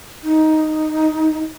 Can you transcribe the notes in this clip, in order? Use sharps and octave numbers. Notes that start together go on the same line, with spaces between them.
D#4